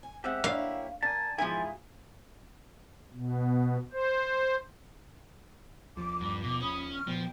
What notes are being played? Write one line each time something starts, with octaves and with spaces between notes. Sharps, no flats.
G#5
G#3 C4 G4 E5 F#5
A#3 E4 C#5 F5
D4 A#4 G#5 A5
G#2 B2 E3 F3 E4 F4 G#4 G#5
B2
C5
D#2 F3 D6
G2
B2 D6
C#4 B5 D#6
C#6 F6
A#2 F3 B3 G5